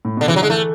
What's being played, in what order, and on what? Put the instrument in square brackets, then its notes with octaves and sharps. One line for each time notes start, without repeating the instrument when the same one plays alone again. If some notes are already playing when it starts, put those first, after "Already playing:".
[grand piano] A2
[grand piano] B2 [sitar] D3
[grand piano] C#3 [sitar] E3
[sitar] F#3
[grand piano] D3 [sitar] G#3
[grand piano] E3 [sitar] A3